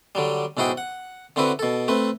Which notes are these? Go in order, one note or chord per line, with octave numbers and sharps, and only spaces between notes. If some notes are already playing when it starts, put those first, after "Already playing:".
D3 F#3 G3
B1 G#2 E4 F#4 G#4 G5
F#5
D3 C4 E4 F#4 B4
B2 A4
A3 C4 B4